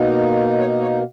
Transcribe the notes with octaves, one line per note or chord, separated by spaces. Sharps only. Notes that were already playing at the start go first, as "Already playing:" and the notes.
Already playing: B2 A#3 D#4
C#5
C#5